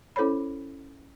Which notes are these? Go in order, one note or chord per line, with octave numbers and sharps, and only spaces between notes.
C#4 E4 A4 C5 C#5 B5